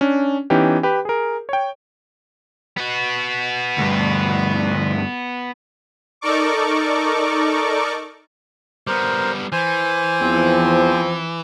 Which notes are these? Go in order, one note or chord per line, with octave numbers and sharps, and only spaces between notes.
C#4 D4
E3 B3 C#4 D#4 G4
G4 B4
G#4 A#4
C#5 G5
B3 F#4
D2 G2
D#4 A4 A#4 D5 C#6 D6
G3 B3 A#4 C5
E3 C5 G#5
E2 F3 C4